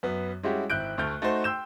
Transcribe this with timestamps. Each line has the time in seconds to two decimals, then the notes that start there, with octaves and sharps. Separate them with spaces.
0.03 F#2 B3
0.43 G3 G#3 C#4 E4 F#4 G4
0.70 G#1 E4 F#6 G6 D7
0.98 D2 A3 F6 G6
1.22 A3 D#4 F#4 C5
1.44 G5 C6 E6 G6 E7